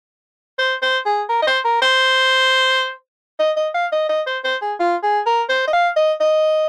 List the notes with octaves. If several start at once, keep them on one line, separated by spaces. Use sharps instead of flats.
C5
C5
G#4
A#4
D#5
C5
A#4
C5
D#5
D#5
F5
D#5
D#5
C5
C5
G#4
F4
G#4
A#4
C5
D#5
F5
D#5
D#5